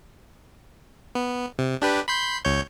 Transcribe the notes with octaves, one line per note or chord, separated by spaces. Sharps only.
B3
C3
D4 G4 B4
B5 C6 G6
C#2 C#5 G6